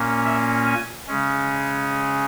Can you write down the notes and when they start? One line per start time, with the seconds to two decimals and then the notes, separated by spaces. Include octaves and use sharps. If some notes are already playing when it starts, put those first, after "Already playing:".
Already playing: A#2 A#3 C#4
0.25 E5
0.67 G#5
1.07 C#3 G#3 C#4